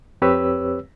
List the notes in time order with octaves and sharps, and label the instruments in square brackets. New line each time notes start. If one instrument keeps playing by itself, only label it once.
[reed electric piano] F2 C4 G4 B4 C#5 E6